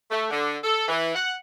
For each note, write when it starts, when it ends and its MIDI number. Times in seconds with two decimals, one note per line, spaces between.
0.11 0.27 57
0.31 0.56 50
0.64 0.84 69
0.88 1.13 52
1.15 1.33 78